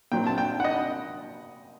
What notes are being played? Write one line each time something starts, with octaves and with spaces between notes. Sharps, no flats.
A#2 F#3 C4 G5
A5
G5
F#5
D#5